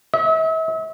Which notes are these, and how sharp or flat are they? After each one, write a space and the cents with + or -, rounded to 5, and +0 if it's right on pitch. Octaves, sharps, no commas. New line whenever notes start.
E5 -40